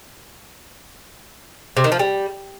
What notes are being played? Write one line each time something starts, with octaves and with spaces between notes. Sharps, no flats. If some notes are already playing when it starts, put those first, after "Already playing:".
C3
D#3
F3
G3